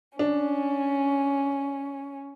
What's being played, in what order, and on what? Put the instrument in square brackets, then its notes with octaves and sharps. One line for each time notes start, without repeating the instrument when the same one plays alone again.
[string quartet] C#4 [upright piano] D4